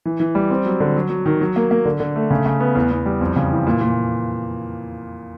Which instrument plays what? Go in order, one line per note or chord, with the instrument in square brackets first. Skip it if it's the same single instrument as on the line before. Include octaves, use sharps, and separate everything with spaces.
[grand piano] E3
E3
G3
C4
F#3
D3
F#3
F#3
D#3
F#3
A#3
A#3
D3
D3
A3
C#3
C#3
B3
E2
E2
G3
F2
C#3
E3
A#2
A#2